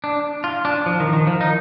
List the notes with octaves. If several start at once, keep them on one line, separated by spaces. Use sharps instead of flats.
D4
F4
D4
F3
D#3
D#3
F3
D#4